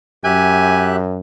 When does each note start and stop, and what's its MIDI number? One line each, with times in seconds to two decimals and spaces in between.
0.24 1.20 42
0.24 0.96 67
0.24 0.96 76
0.24 0.90 80
0.24 0.96 90